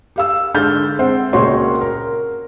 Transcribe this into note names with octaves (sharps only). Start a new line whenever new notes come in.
G4 F5 E6
G#2 D3 F6 G6 A6
G#3 C4 C5 E5 F#5
C#2 A#2 F#4 C#5 C6
A#4